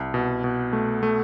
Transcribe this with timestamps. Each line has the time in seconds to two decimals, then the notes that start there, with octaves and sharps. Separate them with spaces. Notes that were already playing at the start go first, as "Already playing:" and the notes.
Already playing: C2
0.14 B2
0.44 B2
0.73 A3
1.03 A3